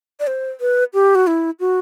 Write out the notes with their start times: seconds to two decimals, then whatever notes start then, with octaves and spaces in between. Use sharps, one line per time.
0.20 D5
0.27 C5
0.61 B4
0.94 G4
1.15 F#4
1.27 E4
1.60 F#4